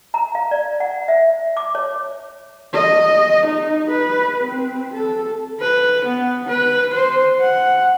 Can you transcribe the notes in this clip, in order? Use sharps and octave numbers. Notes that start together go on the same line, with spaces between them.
A#5
F5
D5
F#5
E5
D6
C#5
D#5
D#4
B4
C4
A4
B4
B3
B4
C5
F#5